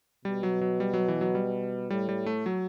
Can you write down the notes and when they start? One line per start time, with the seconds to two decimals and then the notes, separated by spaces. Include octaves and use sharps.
0.25 B2 G3
0.43 F#3
0.61 F#3
0.80 G3
0.94 F#3
1.08 E3
1.21 F#3
1.35 G3
1.90 A2 G3
2.09 G3
2.26 A3
2.46 F#3